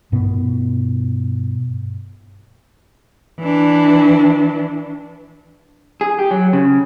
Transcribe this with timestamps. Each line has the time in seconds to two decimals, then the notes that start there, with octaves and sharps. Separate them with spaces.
0.12 G2 B2 B3
3.40 E3 D4
6.01 G#4
6.19 G4
6.31 F#3
6.53 C#3